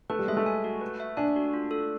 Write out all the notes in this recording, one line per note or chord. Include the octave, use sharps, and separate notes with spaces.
A3 B4
G3
G#3 E5
A3
G#5
F#4
B4
E5
D4 G#5
F#4
F4
A4